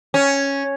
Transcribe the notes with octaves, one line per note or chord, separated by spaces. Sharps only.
C#4